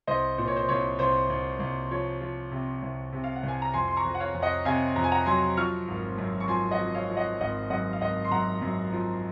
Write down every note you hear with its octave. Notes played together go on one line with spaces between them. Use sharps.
C2 C5 D#5
A#2 C5
C#5
C5
C2 C#5
C2 C5
C2
C2
F3 C#5
F3
C3
C2
C3
F5
F#5
C2
G#5
A#5
F2 G#5 C6
C6
A#5 C#6
F2
F#5
C#5 F5
F2
D#5 F#5
C3 F5 G#5
F2 A#5
G#5
F#5 A#5
F#3 G#5 C6
F3 C#6 F6
G#1
F#2
C#6
F3 G#5 C6
D#5 F#5
F3
C#5 F5
F3
D#5 F#5
G#1 D#5 F#5
F#2 D#5 F#5
F5
G#1 D#5 F#5
C6
F#2 F#5 A#5
F#2
F3